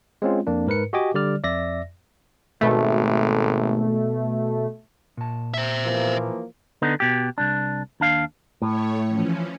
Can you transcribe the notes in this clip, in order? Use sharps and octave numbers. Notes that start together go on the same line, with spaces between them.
G#3 C4 C#4 F4
F2 A#3 D4
G#2 A#4 B4 C#7
F#4 G4 D#5 G#5 D6
D3 G3 D5 F6
F2 D5 E5 A#6
G#1 B2 A3
A#2 A5
C5 E5
E3 F3 A#3
D3 B3 D#4
B2 G4
C2 D4
D#2 D4 F5
A2 A3 C#5
E3 F3 C#4